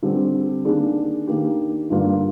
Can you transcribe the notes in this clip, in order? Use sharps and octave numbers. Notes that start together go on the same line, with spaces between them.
D3 G3 C4
D#3 A#3 D4 G#4
D#3 A#3 D4 G4
G2 D3 G3 A#3 F4